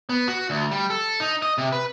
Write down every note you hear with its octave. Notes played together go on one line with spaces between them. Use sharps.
B3
F#4
D2
G3
A4
D#4
D#5
C3
B4